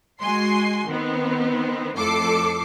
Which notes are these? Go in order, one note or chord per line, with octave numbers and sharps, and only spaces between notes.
G#3 F#4 G#5 C6 C7
D#3 B3 C4
F2 A2 A4 D6 C7